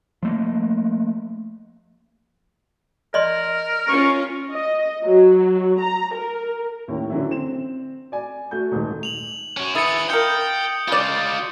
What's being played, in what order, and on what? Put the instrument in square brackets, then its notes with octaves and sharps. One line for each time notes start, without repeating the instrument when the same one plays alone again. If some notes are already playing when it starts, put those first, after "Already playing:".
[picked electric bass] F3 A3 A#3
[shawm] A#4 [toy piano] D5 D#5 C6
[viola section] C#4 F4 [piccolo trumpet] C#6
[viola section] D#5
F#3
A#5
A#4
[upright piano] D#2 A2 C#4
D3 E3 F#3 C#4 E4
C4 E7
D5 G#5
A3 F#4 G6
D#1 G#2 A3
[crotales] F7 F#7
[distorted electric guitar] C#4 F#4
[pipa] E4 [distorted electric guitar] G#4 B4 [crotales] D#6 A6 C#7
[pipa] F4 A#4 [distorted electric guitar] G5 [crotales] G6 C#7
[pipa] C#3 D5 [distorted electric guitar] G#3 F4